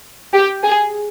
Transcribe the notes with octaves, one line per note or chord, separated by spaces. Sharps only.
G4
G#4